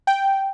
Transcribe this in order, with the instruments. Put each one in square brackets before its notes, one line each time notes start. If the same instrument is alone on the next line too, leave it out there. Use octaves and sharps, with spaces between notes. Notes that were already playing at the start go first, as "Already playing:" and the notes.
[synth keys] G5